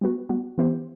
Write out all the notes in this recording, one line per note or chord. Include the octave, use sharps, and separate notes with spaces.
G3 B3 F#4
G3 B3 F#4
E3 B3 E4 G4 C5